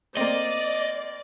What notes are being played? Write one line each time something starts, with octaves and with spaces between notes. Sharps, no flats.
A#3 C4 D5 D#5